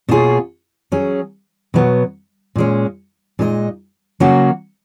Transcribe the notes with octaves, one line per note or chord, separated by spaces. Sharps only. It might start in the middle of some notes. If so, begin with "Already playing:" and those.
B2 A#3 F4 G#4 C#5
F#3 C#4 G#4
B2 F#3 B3
A#2 G#3 C#4
A#2 G#3 D#4 A#4 D#5
C#3 F#3 A#3 C#4 F#4